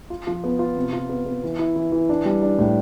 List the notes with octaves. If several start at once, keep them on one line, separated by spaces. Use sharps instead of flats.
F4
F3
B3
F4
C3
F4
B3
B3
E3
E4
E3
E3
D4
G3
D4
A2